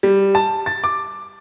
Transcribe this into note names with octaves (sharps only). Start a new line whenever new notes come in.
G3
A5
A6
D6